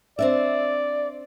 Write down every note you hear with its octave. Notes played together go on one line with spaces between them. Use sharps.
C4 D4 D5 E5